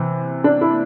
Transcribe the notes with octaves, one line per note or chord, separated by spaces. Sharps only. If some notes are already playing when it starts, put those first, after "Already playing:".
Already playing: C3 E3
D4
E4